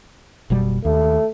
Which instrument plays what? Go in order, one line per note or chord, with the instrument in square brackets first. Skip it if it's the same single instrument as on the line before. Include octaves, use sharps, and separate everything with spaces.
[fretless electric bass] F#1 B2 G3
[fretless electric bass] D#2 [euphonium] A3